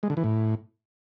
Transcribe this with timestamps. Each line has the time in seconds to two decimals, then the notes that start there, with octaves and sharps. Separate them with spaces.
0.03 G#3
0.10 D3
0.17 E3
0.24 A2